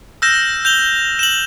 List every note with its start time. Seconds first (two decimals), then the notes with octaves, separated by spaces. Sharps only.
0.22 E6 F6 G6 A#6 E7
0.65 G6 F7 G7
1.19 E7 F#7